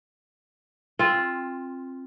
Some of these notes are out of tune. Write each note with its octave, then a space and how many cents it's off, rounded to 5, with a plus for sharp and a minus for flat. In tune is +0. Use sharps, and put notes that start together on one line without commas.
C4 +20 F4 +0